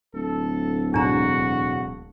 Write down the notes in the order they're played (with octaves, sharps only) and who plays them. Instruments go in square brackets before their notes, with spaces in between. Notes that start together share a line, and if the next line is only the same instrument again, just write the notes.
[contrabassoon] D1 [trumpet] A4
[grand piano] E1 [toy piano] D4 A#5 [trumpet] F#4